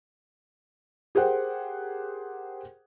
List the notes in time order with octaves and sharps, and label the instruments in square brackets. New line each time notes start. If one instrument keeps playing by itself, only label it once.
[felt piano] G4 G#4 A#4 C5 F#5 G5